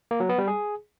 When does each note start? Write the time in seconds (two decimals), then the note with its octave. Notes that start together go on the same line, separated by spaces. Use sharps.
0.11 A#3
0.20 F#3
0.29 B3
0.38 G3
0.48 G#4